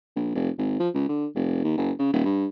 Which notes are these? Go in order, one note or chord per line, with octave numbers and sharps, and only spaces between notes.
A#1
F1
G#1
F3
C#2
D3
F1
D#2
F#1
C#3
D#1
G2